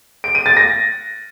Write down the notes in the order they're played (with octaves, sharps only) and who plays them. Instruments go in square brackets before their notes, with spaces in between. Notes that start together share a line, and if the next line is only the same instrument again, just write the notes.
[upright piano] D7
D#7
A6
A#6